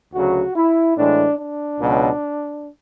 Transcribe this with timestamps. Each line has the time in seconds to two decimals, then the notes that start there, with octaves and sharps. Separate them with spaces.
0.14 D2 C#3 F#3 F#4
0.55 E4
0.97 A2 E3 G#3 D4
1.38 D4
1.80 C#2 B2 F#3